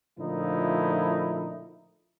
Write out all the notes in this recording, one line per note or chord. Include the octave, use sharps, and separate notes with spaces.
A#2 D3 F3 A3 D#4 E4